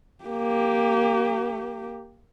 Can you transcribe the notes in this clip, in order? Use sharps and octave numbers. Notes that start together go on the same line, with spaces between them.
A#3 G4